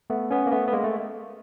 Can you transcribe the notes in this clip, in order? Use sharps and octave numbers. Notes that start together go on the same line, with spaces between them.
A3 B3
B3 C#4
A#3
A3 B3
B3
G#3 A#3
A3